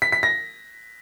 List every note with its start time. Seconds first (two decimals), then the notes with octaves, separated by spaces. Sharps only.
0.02 B6
0.12 B6
0.23 A#6